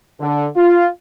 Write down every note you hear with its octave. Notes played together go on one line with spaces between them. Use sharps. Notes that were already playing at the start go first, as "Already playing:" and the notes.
D3
F4